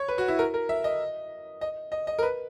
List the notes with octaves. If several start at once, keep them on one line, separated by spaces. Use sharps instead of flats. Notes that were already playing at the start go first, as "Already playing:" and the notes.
Already playing: C#5
B4
F#4
E4
A#4
A#4
E5
D#5
D#5
D#5
D#5
A#4
B4